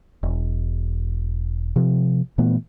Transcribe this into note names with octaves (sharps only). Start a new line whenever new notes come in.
E1
C3 F3
A#2 E3 A3 B3